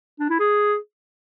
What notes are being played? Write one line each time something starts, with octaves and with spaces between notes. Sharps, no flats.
D4
E4
G#4